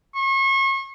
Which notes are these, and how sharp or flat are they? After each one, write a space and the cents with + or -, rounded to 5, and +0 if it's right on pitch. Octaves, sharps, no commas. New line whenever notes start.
C#6 -35